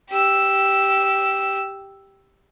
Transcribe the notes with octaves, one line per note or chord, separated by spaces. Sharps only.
G4 E6